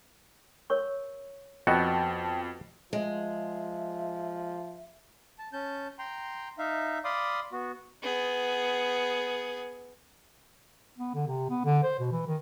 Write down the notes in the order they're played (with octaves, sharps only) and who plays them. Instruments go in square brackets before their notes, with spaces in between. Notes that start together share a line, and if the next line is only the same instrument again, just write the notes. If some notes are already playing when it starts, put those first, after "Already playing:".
[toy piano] A#4 C#5 C#6
[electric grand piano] F2 [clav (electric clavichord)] B3 F#4 A4 [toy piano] D5 D#5 [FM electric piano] G5 A5
[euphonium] F3 [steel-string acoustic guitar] G#3 [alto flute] E5
[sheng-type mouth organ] A5
C#4 A5 G6
G5 A#5 C6
D#4 E5 F5
D5 F5 B5 C6 D6 D#6
B3 F#4
[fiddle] B3 G#4
[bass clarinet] B3
D3
C3
B3
D3
C5
B2
E3
D#3